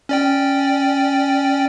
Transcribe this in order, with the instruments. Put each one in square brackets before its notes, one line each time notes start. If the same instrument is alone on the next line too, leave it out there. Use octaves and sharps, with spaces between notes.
[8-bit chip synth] C#4 D5 G5